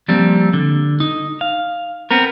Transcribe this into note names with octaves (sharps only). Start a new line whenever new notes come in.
F3 G3 A#3 C4
D3
D#4
F5
B3 C4 A#4